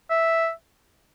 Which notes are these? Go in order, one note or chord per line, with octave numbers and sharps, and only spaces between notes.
E5